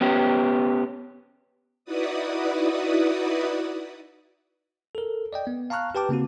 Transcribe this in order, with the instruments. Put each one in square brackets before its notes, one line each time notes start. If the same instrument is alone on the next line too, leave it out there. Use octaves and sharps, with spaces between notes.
[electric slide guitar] B3 C#4 G4
[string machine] D#4 E4 F#4 B4 D5 D#6
[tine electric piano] A4 A#4
D5 D#5 G5
B3
F5 A5 A#5 C#6 F6 F#6
G4 B4 G5 A5 D6
C#3 A#3 C4 F#4